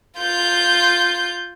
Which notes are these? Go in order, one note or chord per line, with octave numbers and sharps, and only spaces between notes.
F4 G6